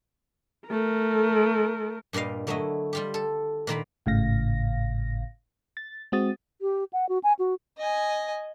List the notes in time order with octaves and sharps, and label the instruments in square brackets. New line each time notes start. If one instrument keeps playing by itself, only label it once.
[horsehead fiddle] A3 A#4
[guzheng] G2 A#2 G3 D#5 F5
D3 F#3 A3 E4 D#5
G3 F4 G4
A4
A#2 D#3 A#3 B5
[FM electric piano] G#1 A2 C#3 F5 A#6
A6
G#3 C4 F#4 D#6 A6
[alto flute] G4
F#5
F#4
G#5
F#4
[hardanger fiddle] D#5 G#5